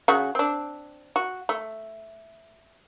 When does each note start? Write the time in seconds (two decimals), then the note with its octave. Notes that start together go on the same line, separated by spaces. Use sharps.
0.08 C#3 F#4
0.35 C4 D4
1.16 F#4
1.49 A3